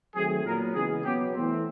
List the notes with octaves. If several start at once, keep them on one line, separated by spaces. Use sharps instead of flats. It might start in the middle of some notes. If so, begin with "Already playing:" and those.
D#3 F#3 A3 C4 G#4
A#2 F#3 B3 A#4
C#3 E3 G#3 B3 G#4
B2 F#3 B3 G4
E3 A3 C4